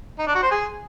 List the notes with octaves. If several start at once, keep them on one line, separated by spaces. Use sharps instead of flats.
D#4
D4
F#4
C5
G#4